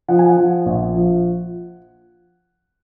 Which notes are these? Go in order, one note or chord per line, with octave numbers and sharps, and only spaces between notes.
F3 F#5
G#5
F#5
F3
A#1
F3